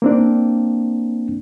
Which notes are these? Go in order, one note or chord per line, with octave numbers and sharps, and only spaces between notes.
A#3 C4 D4